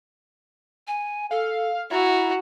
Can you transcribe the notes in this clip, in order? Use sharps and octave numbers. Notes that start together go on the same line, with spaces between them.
G#5
A4 F5
E4 F#4 A#5